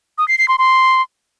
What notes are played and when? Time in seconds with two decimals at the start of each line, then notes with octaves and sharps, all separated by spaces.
0.18 D#6
0.28 C7
0.38 C7
0.48 C6
0.58 C6